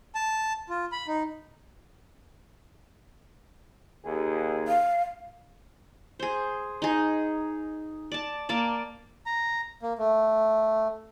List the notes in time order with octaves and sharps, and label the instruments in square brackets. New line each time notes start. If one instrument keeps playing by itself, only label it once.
[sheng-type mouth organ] A5
F4
B5
D#4
[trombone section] D#2 G#4
[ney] F5
[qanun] G#4 C5
D#4 G#4
D5 A5
A#3 D5 A5
[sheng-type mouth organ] A#5
A#3
A3